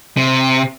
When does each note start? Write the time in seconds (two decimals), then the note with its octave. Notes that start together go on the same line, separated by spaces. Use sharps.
0.17 C3